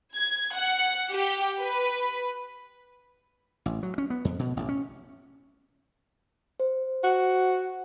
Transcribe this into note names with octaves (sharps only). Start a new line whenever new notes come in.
G#6
F#5
G4
B4
A1
F#3
C#4
B3
F2
B2
A1
C#4
C5
F#4